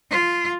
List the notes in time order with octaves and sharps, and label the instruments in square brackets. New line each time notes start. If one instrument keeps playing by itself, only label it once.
[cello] F4